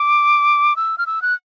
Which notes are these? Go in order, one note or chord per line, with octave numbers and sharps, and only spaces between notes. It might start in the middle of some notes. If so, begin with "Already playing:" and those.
Already playing: D6
E6
F6
E6
F#6